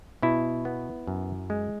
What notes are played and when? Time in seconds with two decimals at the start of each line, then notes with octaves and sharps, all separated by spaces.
0.22 B2 E4
0.65 B3
1.07 F#2
1.50 G#3